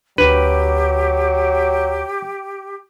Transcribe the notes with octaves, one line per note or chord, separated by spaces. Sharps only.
D2 F#3 D4 G4 B4